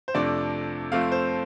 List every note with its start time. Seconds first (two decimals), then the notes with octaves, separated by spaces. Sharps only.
0.08 C5
0.14 F2 C3 A3 D4 D5
0.92 F2 F3 A3 C4 F5
1.12 C5